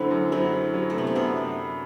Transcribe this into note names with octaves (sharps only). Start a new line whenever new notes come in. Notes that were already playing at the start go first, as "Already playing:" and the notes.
Already playing: F#2 D3 F#3 A3 C4 E4
F#2
F#3 C4 E4
F#3
F#3
A3
C3 B3
C4
F#2 B3 D4